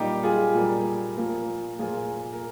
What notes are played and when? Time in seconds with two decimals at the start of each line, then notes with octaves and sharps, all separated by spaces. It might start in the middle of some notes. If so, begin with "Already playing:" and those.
Already playing: A#2 G3 A#3 D#4 G4
0.23 F4 G#4
0.55 A#2 G3 A#3
1.18 A#2 F3 A#3
1.79 A#2 F3 A#3 F4 G#4
2.32 A#4